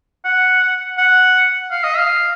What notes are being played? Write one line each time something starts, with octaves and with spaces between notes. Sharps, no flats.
F#5
F#5
F5
D#5
F5